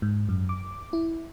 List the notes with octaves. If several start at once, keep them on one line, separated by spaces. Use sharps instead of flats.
G#2
F#2
D6
E4